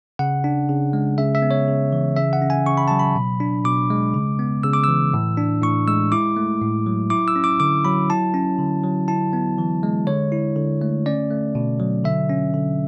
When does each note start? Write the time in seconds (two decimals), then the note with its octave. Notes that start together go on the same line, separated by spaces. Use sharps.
0.19 C#3 F#5
0.44 D4
0.69 C#3
0.93 G#3
1.18 C#3 E5
1.35 E5
1.42 B3
1.51 C#5
1.68 C#3
1.92 E3
2.16 C#3 E5
2.33 F#5
2.42 C#4
2.50 G#5
2.66 C#3 C#6
2.77 B5
2.88 F#3 A5
2.99 B5
3.16 B2
3.40 D4
3.65 B2 D6
3.90 G#3
4.15 C#3
4.39 B3
4.63 C#3 E6
4.73 D6
4.84 E3 E6
5.14 A2
5.37 D4
5.62 A2 C#6
5.88 G#3 E6
6.12 E4 D6
6.37 A3
6.61 A2
6.86 F#3
7.10 E4 D6
7.28 E6
7.36 C#4
7.44 D6
7.60 D3 D6
7.85 F#3 B5
8.10 E4 A5
8.34 C#4
8.59 D3
8.84 F#3
9.08 E4 A5
9.33 B3
9.58 E3
9.83 G#3
10.07 D3 C#5
10.32 E4
10.56 D3
10.81 A3
11.06 C#4 D5
11.30 A3
11.55 B2
11.80 F#3
12.05 D3 E5
12.29 C#4
12.54 D3